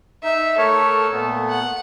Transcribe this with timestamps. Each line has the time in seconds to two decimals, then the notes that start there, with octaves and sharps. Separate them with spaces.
0.24 D#4 E5
0.58 A3 A4 A#4 C#5
1.12 A#2 A3 B3
1.49 F#5